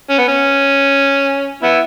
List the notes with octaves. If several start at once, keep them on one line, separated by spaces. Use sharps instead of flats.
C#4
B3
C#4
B3 E4